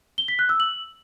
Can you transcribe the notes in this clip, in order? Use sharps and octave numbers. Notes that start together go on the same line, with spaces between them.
G7
B6
F#6
E6
F#7